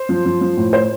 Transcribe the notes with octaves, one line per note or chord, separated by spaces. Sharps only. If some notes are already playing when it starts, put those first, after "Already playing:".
Already playing: C5
F3
F3
F3
A2
C5